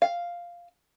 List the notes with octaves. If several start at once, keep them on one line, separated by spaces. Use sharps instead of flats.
F5